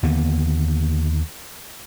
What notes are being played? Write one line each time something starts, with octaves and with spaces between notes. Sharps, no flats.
D#2 D3 A#3 B3